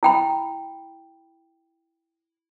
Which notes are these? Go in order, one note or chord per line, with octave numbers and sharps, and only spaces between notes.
E4 G5 B5